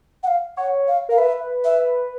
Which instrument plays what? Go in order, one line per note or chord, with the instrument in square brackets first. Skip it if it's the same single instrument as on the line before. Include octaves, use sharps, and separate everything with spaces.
[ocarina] F#5
F5
[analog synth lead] C#5 [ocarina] F#5
[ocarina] F5
[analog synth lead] A#4 [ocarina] F5
[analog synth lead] B4 [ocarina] E5
[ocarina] E5